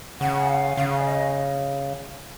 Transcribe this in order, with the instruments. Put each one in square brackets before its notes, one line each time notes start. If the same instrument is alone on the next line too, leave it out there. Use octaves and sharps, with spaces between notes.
[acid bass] C#3 [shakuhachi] F#5
[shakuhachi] F5
[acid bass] C#3 [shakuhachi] F5
[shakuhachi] D5
D#5